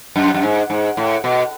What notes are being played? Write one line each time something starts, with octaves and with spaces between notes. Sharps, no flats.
F#2
F#2
G#2
G#2
A2
B2